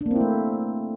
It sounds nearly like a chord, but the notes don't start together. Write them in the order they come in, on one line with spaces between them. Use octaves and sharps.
D4 A#3 C4 E4 A3